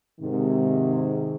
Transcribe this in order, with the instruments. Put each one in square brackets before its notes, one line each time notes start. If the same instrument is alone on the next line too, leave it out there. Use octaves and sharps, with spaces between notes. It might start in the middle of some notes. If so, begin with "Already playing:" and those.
[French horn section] G#2 C3 D#3